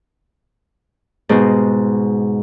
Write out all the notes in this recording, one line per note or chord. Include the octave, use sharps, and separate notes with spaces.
G#2 B2 G#3